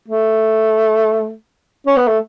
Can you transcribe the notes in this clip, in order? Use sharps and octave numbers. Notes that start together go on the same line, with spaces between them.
A3
C#4
B3
A3